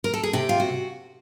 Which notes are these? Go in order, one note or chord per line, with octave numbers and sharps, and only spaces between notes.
A#4
A4
G#4
C3 G4
F4
F#4